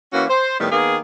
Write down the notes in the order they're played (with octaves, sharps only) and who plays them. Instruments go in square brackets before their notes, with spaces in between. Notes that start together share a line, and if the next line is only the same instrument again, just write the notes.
[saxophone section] E3 A#3 C#4 F#4
C5
A2 D#3 G3 B3
D#3 A#3 B3 G#4